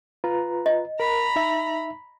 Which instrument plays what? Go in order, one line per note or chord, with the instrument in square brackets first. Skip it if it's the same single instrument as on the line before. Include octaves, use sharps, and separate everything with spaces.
[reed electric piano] F4 B4 A#5
[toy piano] D#5
[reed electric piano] A#4 [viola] A#5 B5
[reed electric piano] D#4 E5